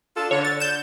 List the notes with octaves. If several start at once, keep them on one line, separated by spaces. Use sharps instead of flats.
D4 F4 A4
D3 C#5
A6
G6 E7